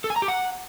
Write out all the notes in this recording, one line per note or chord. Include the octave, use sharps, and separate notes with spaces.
A4
G#5
A#5
G4
F#5